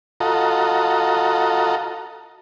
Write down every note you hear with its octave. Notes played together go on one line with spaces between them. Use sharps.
F4 F#4 A4 D#5 A#5